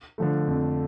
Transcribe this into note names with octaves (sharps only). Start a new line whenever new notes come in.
D3 F3 A3
F2